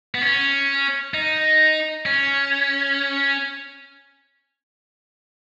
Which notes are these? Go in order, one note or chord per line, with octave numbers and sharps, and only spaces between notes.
B3
C#4
D#4
C#4